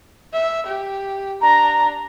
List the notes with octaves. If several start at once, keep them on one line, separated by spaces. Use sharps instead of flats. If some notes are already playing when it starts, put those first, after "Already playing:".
E5
G4
D4 A#5